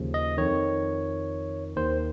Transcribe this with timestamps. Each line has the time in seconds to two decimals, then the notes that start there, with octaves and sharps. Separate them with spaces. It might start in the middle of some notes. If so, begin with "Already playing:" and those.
Already playing: D#2 C#3 F3
0.14 D#5
0.38 F2 D#3 C#5
1.76 D#2 D#3 C5